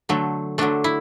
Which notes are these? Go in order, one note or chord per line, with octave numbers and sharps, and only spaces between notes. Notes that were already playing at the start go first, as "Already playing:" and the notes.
D3 F#3 A3
D3 F#3 A3 D4
E4